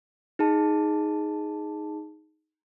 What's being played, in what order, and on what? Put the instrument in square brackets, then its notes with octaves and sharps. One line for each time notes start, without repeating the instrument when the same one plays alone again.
[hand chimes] D#4 G#4 A5